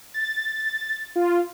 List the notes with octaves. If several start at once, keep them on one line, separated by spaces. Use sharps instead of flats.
A6
F4